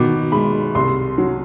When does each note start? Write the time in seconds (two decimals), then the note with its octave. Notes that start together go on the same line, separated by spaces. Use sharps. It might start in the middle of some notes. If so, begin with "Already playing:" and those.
Already playing: B2 D#3 D6
0.32 G#3 B5
0.75 C2 C6
1.18 F#3